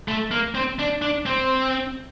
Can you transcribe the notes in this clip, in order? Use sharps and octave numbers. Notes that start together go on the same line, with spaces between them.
A3
A#3
C4
D4
D4
C4